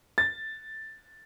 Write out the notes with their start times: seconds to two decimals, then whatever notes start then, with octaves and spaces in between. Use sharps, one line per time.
0.18 A6